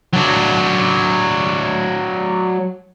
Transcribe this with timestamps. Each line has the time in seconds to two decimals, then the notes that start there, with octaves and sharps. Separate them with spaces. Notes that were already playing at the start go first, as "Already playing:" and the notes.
0.13 F#3 D4